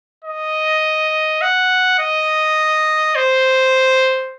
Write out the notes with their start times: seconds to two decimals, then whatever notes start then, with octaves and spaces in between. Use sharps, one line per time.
0.24 D#5
1.42 F#5
1.99 D#5
3.16 C5